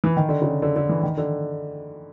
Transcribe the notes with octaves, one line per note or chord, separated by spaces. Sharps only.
E3
D#3
D3
C#3
D3
D3
E3
D#3
D3